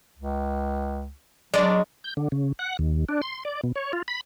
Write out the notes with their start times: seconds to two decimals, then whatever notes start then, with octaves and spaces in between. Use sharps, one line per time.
0.18 C#2
1.54 F#3 G#3 D4 D5
2.04 G6
2.17 D3
2.32 C#3
2.59 F#5
2.79 D#2
3.09 D4
3.22 C6
3.45 D5
3.64 B2
3.76 C#5
3.93 F4
4.08 B5